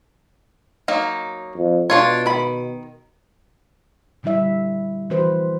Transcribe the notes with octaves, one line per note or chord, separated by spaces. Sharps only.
F#3 A#3 D#4
F2
B2 D4 F4 C#5
D#3 B5
A#2 D3 G3 E4 E5
E3 F3 F#4 B4 C5